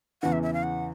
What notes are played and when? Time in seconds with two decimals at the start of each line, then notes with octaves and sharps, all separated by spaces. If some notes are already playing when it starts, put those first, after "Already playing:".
0.22 E2 C#3 E3 F#5
0.32 E5
0.43 E5
0.53 F5
0.63 F#5